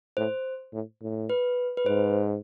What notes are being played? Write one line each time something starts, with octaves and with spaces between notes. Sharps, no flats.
A2 C5
A2
A2
B4
B4
G#2 C5